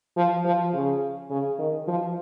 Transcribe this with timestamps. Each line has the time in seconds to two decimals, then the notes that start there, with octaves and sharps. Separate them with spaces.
0.17 F3
0.45 F3
0.74 C#3
1.30 C#3
1.59 D#3
1.88 F3